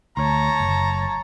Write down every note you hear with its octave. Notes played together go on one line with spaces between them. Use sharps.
D2 C#5 A5 A#5
F#1